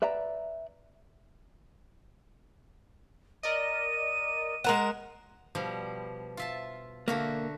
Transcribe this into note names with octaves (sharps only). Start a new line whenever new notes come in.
B4 D5 E5 G5 A#5
A#4 D5 D#5 D#7
G#3 A#4 F#5 E7
B2 F3 G3
F4 E5 A5
D3 A#3 F#4 E5